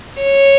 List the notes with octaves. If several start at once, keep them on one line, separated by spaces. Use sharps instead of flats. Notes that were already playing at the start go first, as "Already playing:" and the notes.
C#5